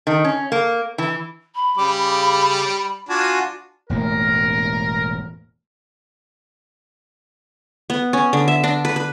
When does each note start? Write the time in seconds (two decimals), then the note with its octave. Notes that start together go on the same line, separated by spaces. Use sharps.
0.07 D#3
0.24 C#4
0.52 A#3
0.98 E3
1.55 B5
1.77 C#3 G3 D6
3.09 D4 F4 F#4 G#5
3.90 E1 A2 A#3 A#4
7.90 B3
8.13 C#4
8.33 D3
8.48 E5
8.64 D4
8.85 B4
8.96 B4